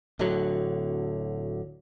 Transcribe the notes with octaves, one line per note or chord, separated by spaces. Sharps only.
D1 D2 D3 F#3